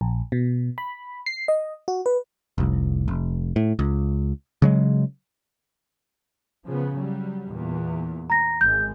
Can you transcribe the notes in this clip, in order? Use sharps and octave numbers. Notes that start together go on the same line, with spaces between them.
A#1
B2
B5
C7
D#5
F#4
B4
F1 C2
F1
A2
C#2
C#3 F#3 G#3
C#3 F3 B3
F#3 G3
E2 A#2
A#5 A#6
G#1 G#3 G6